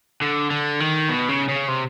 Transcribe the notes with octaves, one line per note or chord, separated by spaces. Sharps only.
D3
D3
D#3
B2
C#3
C#3
C3